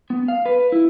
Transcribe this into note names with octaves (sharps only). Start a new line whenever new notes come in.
B3
F5
B4
E4